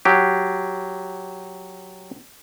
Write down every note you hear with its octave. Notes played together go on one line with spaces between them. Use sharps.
F#3 G4